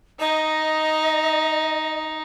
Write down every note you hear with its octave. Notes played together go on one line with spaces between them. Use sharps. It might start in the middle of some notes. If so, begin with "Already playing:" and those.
D#4 D#5